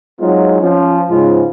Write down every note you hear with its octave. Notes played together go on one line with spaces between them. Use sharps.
F#3 G#3 C4 D#4 F4
F3 C#4
G#2 C#3 F3 G#3 F4